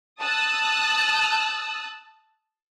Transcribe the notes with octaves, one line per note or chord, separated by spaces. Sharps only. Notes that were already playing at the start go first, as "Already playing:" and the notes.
A5 D#6 E6 F#6